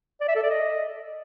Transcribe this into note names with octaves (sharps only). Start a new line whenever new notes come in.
D5
E5
A4
D5
D#5